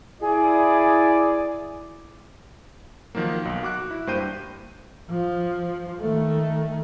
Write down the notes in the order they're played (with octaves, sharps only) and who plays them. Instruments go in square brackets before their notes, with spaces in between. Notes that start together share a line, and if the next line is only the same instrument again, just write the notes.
[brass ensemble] E4 D5 [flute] G#4
[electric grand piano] D#3 F3 F#3 A#3
B1
F#4 D6 F#6
E4
G2 A#3 C5 G5 G6 D#7
[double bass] F3
D#3 A3